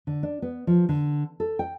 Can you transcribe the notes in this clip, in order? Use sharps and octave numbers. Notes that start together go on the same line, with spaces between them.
D3
D4
B3
F3
D3
A4
G5